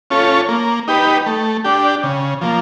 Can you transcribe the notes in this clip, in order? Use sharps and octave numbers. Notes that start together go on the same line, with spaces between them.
C#4 F4 A4 C#5
A#3
D#4 G4 B4
A3
D4 G4
C#3
F3 A#3